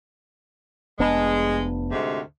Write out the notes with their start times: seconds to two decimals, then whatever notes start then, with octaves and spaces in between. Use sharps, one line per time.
1.00 F1 G#3 B3 D4
1.92 D2 G#2 C3